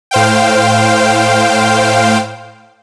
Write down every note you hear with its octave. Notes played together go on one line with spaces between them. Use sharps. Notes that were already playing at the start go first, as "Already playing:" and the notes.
A2 C5 F5 G5